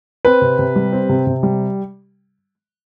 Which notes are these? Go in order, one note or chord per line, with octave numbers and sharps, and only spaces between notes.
C4 B4
C3
C3
G3
C4
C3
C3
G3